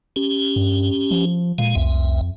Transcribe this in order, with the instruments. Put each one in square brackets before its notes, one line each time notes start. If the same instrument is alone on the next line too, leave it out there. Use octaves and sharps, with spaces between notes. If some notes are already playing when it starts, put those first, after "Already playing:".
[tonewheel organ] C#4 G4
[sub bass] G2
F3
[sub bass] A#2 [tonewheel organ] G#3 F5
[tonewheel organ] C2 E5 [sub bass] F2